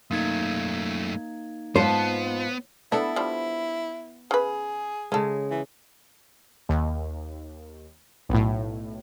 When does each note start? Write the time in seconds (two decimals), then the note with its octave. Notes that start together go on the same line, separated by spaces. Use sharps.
0.11 F#2 A3 A#3 D#4 G#6
1.76 G#2 B3 F4 C5 A5
2.92 B3 D4 E4 A4
3.16 F3 G3 D4
4.31 C#3 G#4 B4
5.12 C#3 G#3 C#4 A4
5.51 E3
6.69 D#2
8.29 B1 A2